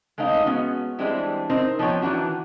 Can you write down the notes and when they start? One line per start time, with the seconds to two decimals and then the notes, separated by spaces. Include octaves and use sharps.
0.18 G#3 A3 C4 D#4 F5
0.45 G#3 B3 C#4 F#4
0.98 E3 G3 G#3 C4 D4 E4
1.50 C4 D#4 A#4 C5
1.79 F3 B3 D#4 C#5 G5
2.01 D#3 E3 D4 F#4 A#5